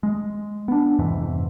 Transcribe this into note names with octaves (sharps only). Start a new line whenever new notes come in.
G#3
B3 D4
F2 G#2 C3 E3